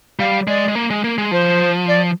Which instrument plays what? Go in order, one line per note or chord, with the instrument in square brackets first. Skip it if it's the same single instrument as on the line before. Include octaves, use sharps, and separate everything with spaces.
[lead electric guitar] G3 [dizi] F5
[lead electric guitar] G#3 [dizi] D5
[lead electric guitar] G#3
A#3
G#3
A#3
G#3
[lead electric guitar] F3 [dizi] C5
[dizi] D5